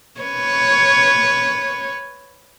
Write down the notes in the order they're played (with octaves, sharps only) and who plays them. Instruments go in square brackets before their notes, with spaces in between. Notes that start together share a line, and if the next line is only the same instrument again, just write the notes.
[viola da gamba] B4 C#5